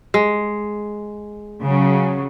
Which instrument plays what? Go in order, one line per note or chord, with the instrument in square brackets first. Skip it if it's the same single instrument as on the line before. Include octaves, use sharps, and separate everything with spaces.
[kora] G#3
[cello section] C#3 F#3